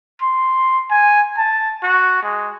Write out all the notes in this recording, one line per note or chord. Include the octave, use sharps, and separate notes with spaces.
C6
G#5
A5
F#4
G#3